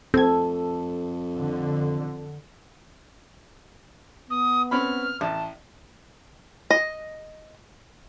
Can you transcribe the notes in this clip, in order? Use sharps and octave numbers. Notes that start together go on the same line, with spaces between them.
F2 C4 A4 G#6
D3
B3 D#6
C4 C#4 B5 F6
A1 A5
D#5